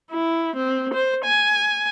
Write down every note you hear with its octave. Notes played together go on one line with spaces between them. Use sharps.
E4
C4
C5
G#5